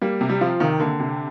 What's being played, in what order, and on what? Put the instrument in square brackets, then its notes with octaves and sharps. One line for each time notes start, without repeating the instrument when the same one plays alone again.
[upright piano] G3 [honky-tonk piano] A#3
[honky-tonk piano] C3
[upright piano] G3
[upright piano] F3 [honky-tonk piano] F4
[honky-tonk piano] C3 [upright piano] D#3
[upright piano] D3 [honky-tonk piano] A#3
[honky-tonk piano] C3